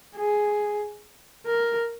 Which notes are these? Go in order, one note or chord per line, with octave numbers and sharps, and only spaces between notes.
G#4
A#4